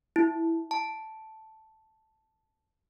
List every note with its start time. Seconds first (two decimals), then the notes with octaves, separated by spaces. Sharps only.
0.16 E4
0.71 A5